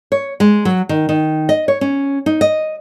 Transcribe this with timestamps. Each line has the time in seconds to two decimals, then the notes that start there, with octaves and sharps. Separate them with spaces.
0.12 C#5
0.40 G#3
0.65 F#3
0.89 D#3
1.09 D#3
1.49 D#5
1.68 C#5
1.81 C#4
2.26 D#4
2.41 D#5